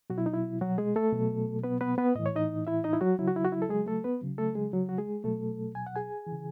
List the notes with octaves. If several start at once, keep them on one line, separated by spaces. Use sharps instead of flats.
B2 F#3 F#4
E4
D#4
E4
F#3 F#4
G#3 G#4
A3 A4
B2 F#3
B3 B4
B3 B4
B3 B4
A2 E3 D#5
C#5
D#4 D#5
E4 E5
D#4 D#5
E4
F#3 F#4
C#3 F#3 E4
F#4
E4
F#4
E4
A4
G#3 G#4
A3 A4
B3 B4
C#3 F#3
A3 A4
G#3 G#4
F#3 F#4
F#4
G#3 G#4
B2 F#3 A3 A4
G#5
F#5
G#4 G#5
E3
C#3